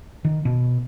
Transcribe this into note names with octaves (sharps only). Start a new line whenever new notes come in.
D#3
B2